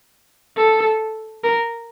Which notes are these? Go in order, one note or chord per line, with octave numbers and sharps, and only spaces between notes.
A4
A#4